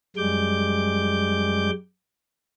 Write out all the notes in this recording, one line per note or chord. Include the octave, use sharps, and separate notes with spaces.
F#2 G3 G#3 D6 G6